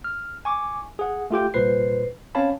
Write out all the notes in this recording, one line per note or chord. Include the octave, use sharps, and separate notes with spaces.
F6
G#5 C#6 D6
G#4 F#5
A3 F4 G4 G5
C2 A#2 B4 C5 C7
C4 C#4 C#5 F5 A5 B5